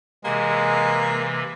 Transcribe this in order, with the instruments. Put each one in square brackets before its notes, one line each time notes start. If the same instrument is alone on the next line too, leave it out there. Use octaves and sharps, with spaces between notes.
[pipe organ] C3 E3 [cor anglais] G#3 [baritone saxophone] A#3